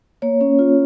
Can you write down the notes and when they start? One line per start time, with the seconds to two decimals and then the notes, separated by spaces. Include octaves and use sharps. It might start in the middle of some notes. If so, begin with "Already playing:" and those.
0.22 A#3 C#5
0.41 C#4
0.59 F4